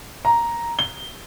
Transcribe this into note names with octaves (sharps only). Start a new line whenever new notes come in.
A#5
G7